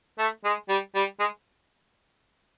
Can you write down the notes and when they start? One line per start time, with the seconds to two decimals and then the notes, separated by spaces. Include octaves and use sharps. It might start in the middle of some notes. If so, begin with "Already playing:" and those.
0.19 A3
0.44 G#3
0.69 G3
0.95 G3
1.20 G#3